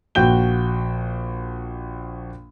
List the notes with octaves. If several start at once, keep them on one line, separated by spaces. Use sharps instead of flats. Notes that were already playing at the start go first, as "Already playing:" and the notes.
A#1 F#4 G5 G6 G7